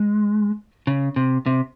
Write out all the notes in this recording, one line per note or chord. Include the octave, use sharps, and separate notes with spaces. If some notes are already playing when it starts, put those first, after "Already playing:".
Already playing: G#3
C#3
C3
C3